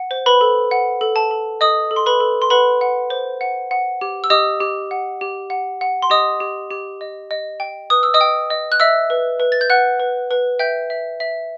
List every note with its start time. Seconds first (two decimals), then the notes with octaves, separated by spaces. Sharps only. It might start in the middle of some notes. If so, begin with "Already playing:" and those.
Already playing: F#5
0.11 C5
0.26 B4 B5
0.41 A4
0.71 F#5
1.01 A4
1.16 A5
1.31 A4
1.61 A4 D#5 D#6
1.91 A4
1.96 C6
2.06 B4 B5
2.20 A4
2.42 C6
2.50 B4 F#5 B5
2.81 F#5
3.10 C5
3.41 F#5
3.71 F#5
4.01 G4
4.24 E6
4.30 G4 D#5 D#6
4.61 G4
4.91 F#5
5.21 G4
5.50 F#5
5.81 F#5
6.02 C6
6.10 G4 D#5 D#6
6.40 G4
6.71 G4
7.01 D#5
7.31 D#5
7.60 G5
7.90 B4 D#6
8.03 E6
8.14 D#5 D#6
8.21 G5
8.50 D#5
8.72 F#6
8.80 D#5 E5 E6
9.10 B4
9.40 B4
9.52 A6
9.61 G6
9.70 B4 F#5 F#6
9.99 B4
10.31 B4
10.59 E5 G5 G6
10.90 E5
11.20 E5